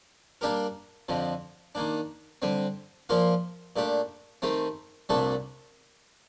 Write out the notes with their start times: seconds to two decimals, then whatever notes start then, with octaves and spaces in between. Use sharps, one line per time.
0.41 G3 A#3 D4 G4 A#4
1.09 F2 D3 F3
1.75 D#3 A#3 D4
2.42 D3 G3 C4
3.09 A#2 F3 A#3 F4 A#4
3.76 A#2 A3 D4 G4
4.42 D#3 A3 C4 G4
5.09 C2 A#2 A3 D4 A4